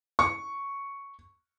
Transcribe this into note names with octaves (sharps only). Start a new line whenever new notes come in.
C#6